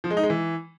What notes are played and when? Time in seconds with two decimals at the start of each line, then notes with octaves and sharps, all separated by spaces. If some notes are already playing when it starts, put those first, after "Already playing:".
0.04 F3
0.10 G#3
0.17 D#4
0.23 G#3
0.30 E3